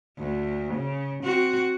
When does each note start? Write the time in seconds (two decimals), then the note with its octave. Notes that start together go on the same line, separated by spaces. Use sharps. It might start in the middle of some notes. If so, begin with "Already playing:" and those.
0.19 D2
0.75 C#3
1.24 C4 F#4